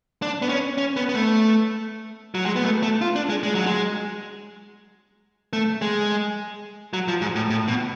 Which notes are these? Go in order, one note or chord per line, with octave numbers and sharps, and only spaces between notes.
D4
B3
C#4
C#4
B3
B3
A3
F#3
G#3
B3
A3
A3
F4
D4
G#3
G#3
F#3
G#3
A3
G#3
F#3
F3
G#2
A2
A2
B2